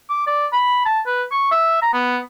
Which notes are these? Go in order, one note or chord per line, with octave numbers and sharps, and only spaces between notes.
D6
D5
B5
A5
B4
C#6
E5
A#5
B3